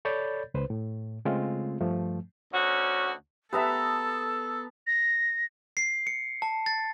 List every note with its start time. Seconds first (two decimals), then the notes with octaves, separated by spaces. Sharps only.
0.05 A4 C#5 D5 B5 G6 A6
0.54 C#2 B4 C5
0.70 A2
1.25 C#3 G#3 A3 C4 F4
1.81 G2 F3 A3
2.52 D2 C#4 F#4
3.53 B3 G4 A4 B4 E5 A5 A#5 E6
4.87 A#6
5.77 C7
6.07 C#7
6.42 A5
6.66 A6